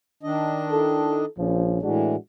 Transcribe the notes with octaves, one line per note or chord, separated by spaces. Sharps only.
D#3 D4 D#5
E4 A4
A#1 F3 C#4
A2 E3 G#3 D4 F#4